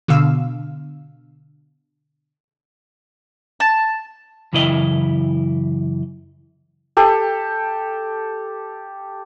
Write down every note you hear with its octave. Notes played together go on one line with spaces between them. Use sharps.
B2 D3 F5 E6
A5
F#2 C#3 E3 E4 B4 D#5
G4 A4